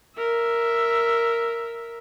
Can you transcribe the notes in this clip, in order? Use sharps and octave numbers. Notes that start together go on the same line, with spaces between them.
A#4 E5